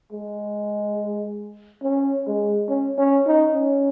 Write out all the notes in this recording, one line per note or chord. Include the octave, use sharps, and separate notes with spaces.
G#3
C#4
G#3
C#4
C#4
D#4
C#4